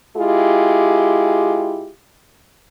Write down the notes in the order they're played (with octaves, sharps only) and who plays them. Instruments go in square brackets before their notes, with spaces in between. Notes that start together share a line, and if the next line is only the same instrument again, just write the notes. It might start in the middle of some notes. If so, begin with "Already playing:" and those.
[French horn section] G#3 E4 F4 G4